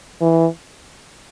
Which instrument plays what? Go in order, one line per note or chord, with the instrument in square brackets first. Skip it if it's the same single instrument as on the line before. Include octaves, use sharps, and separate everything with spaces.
[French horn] E3